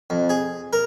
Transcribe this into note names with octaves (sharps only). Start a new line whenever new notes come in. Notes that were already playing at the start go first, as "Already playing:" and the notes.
F2
G#4
A#4